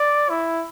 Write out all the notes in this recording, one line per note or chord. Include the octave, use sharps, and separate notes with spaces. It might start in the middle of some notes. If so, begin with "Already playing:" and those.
Already playing: D5
E4